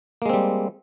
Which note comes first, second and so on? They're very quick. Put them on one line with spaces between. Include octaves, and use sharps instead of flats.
A#3 G#3 C4 G3